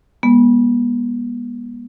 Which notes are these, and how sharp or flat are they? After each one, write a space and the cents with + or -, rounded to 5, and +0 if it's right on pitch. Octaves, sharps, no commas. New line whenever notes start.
G#3 -35 B3 -40